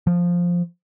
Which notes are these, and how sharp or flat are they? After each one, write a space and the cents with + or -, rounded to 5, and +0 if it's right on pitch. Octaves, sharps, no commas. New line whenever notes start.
F3 +0